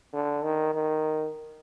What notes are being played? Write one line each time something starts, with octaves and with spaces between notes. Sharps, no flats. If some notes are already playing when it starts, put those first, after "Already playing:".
D3
D#3
D#3